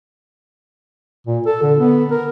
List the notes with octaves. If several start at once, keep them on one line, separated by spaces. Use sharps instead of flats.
A#2
A4
D3
B3
A#4